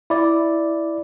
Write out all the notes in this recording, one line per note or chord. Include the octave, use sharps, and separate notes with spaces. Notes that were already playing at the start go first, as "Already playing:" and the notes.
E4 D5